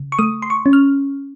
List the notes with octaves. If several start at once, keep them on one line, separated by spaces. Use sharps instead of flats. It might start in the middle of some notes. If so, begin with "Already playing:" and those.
Already playing: C#3
C#6
A3 D#6
C6
C#6
C#4
F6